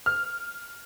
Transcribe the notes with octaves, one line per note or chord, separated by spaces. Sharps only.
F6